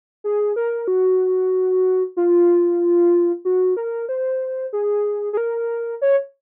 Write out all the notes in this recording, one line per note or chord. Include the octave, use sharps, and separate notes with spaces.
G#4
A#4
F#4
F4
F#4
A#4
C5
G#4
G#4
A#4
C#5